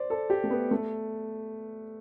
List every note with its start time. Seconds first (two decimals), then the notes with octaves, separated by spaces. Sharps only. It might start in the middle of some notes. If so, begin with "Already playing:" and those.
Already playing: C5 D5
0.10 A4
0.30 G4
0.44 A3
0.50 B3
0.71 A3